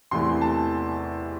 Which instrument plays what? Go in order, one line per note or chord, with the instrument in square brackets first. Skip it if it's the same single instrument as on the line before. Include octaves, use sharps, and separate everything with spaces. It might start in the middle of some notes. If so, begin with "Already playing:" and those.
[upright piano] E2 C3 E3 A3 C6
A5